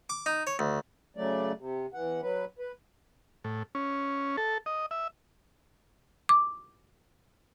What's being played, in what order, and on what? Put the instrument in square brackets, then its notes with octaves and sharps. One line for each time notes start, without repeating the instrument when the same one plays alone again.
[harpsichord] D6
D#4
C#5
D2
[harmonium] C#3 F#3 A3 D5
C3
E2 E3 F#5
F#3 B4
B4
[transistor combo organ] A2
C#4
A4
D#5
E5
[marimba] D6